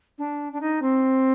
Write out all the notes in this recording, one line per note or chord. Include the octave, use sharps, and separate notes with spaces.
D4
D4
D#4
C4